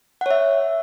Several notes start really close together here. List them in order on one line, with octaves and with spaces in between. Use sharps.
F#5 C#5 E5